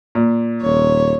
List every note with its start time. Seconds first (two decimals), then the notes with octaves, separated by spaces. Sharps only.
0.15 A#2
0.63 D#1 C#5